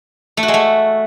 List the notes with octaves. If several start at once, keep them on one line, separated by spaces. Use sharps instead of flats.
A3
F#4
G#3
A3